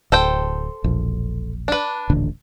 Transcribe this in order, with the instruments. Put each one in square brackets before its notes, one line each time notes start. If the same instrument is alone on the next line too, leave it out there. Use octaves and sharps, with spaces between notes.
[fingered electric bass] D1 [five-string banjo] A4 C5 G5
[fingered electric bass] E1 A#1
[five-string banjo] D4 B4
[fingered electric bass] D#1 A1 D3